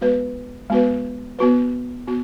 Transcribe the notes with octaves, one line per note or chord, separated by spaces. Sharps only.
G#3 B3 F#4 B4
G#3 B3 F#4 B4
B3 F#4 B4
B3 F#4